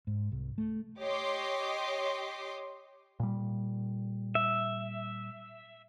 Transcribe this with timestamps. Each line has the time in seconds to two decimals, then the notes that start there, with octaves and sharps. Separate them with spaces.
0.07 G#2
0.32 C2
0.58 A3
1.00 G4 C#5 D#5 C6 D6
3.20 A#2 G3
4.35 E5